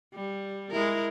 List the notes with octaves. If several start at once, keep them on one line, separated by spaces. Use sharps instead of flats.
G3
G#3 E4 A#4